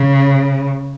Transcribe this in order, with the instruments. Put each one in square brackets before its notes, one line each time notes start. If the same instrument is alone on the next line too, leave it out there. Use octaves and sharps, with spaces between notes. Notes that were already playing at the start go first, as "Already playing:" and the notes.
Already playing: [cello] C#3